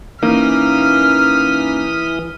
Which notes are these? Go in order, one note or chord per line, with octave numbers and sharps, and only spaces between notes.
E3 A#3 C#4 D#4 D#6 F6 B6